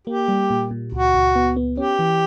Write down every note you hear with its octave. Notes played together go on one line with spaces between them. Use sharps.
A#3 G4
G3
A#2
A#2
C#2 F#4
C#2
B3
B3
C#4 G4
E3